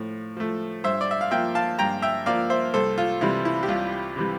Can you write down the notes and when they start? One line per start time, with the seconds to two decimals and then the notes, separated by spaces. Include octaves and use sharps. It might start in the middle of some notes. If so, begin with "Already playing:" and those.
Already playing: A2 F3
0.37 F3 A3
0.84 G2 C5 E5
1.01 D5
1.11 E5
1.21 F5
1.31 F3 A#3 E5 G5
1.55 F5 A5
1.79 G2 G5 A#5
2.02 E5 G5
2.26 F3 A#3 D5 F5
2.50 C5 E5
2.74 C2 A4 C5
2.98 F4
3.21 C3 E3 G3 E4
3.45 E4
3.63 G4
3.68 C2 F4
4.16 C3 E3 G3